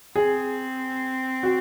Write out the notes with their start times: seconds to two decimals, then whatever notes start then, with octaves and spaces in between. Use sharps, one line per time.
0.16 C4 G#4
1.43 F#4